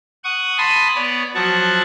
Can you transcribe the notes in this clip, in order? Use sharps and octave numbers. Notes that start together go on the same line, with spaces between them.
F#5 C#6 D#6
G#5 A5 B5 C6 D#6
B3 C#5 D5
F3 F#3 F#5 A5 C#6